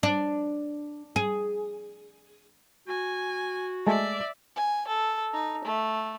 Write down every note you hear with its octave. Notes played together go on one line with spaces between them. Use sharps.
D4
G#4
F#4 G#5
G#3 A3 D5 E5 A5
G#5
A4
D#4
A3